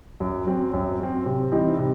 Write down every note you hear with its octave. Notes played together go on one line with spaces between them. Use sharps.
F#2
F#3 C4
F#2
F#3 C4
C3
E3 G3 C4 D#4
C3